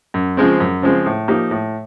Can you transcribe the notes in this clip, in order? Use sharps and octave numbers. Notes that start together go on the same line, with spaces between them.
F#2
C#3 F3 G#3 C4
F#2
C#3 F3 G#3 C4
A2
F3 A#3 D#4 G4
A2